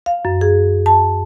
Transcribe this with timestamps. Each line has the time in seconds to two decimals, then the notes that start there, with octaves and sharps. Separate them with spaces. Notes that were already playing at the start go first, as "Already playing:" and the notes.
0.06 F5
0.25 F#2
0.41 G#4
0.86 A5